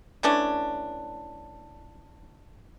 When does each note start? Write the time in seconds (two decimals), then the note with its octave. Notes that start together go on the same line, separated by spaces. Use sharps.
0.23 E3 A3 C#4 D4